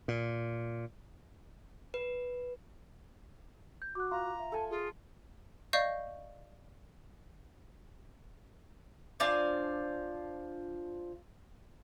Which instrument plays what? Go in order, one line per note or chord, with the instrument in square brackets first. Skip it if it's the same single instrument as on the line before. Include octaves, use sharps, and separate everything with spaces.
[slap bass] A#2
[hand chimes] B4
[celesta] G6
[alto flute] F#4 [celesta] D6 F#6
[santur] F4 [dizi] A#5
[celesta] E5
[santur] A4 G#5 [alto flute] A5
[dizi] F4 [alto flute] G#4
[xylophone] D5 D#5 F5 C#6 G6
[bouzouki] F3 D4 F4 G#5